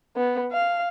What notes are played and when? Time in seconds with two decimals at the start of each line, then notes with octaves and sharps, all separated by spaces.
0.16 B3
0.52 F5